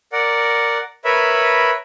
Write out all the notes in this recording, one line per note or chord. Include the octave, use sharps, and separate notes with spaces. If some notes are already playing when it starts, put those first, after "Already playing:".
A#4 D5 F#5
A#4 B4 C#5 E5 B5